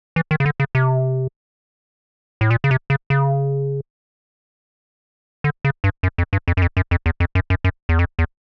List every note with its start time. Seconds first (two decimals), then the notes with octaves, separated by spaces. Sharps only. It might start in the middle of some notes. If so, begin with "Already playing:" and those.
0.16 E3
0.31 D#3
0.40 C#3
0.46 D3
0.60 C#3
0.75 C3
2.41 A2
2.51 A#2
2.64 C#3
2.71 C3
2.90 C#3
3.10 C#3
5.44 D3
5.65 C#3
5.84 G2
6.03 F#2
6.18 F2
6.33 G2
6.48 F2
6.57 F#2
6.62 F2
6.77 F#2
6.91 F2
7.06 E2
7.20 F2
7.35 F#2
7.50 F#2
7.64 F#2
7.89 E2
7.99 F2
8.19 E2